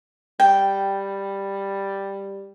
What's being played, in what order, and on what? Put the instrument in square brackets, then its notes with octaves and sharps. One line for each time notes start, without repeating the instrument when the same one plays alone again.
[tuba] G3 [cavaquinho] G5